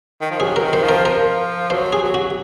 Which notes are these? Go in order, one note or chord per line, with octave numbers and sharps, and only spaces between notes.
D#3
F3
F#3 G#4
A#4
D#3
C5
F3
A#4
F3 A#4
F#3 C5
G#4
F#3
F#4